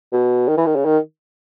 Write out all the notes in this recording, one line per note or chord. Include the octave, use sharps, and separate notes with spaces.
B2
D#3
E3
D#3
C#3
D#3